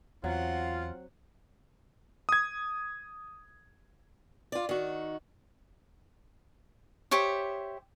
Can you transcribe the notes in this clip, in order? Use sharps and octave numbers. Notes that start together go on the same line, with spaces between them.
E2 F#3 C4 F4 F#5
D#6 G#6
F4 D5
D#3 F#4
G4 C5 C#5 E5